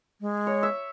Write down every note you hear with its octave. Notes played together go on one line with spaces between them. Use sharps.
G#3
C#5
E5